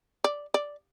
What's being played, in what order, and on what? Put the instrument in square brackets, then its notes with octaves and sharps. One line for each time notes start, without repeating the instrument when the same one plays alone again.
[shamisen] D5
D5